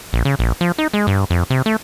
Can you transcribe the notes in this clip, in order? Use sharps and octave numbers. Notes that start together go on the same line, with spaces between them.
A#1
C#3
A#1
F3
D#4
G#3
G2
F2
C3
A3